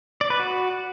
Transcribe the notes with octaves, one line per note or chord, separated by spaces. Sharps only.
D5
B4
F#4